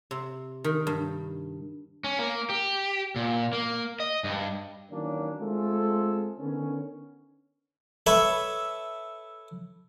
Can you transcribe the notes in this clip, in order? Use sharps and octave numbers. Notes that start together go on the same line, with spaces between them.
C3
D#3
G2
C#4
A#3
G4
A#2
A#3
D#5
G2
D#3 E3 F#3 A#3 C#4 D4
G#3 A3 C4 F4 G#4 A4
D3 D#3 B3 C#4
A4 B4 C#5 E5